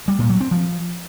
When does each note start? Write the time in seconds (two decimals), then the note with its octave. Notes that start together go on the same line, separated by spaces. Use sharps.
0.08 G3
0.19 A#2
0.30 F#3
0.40 C4
0.51 F3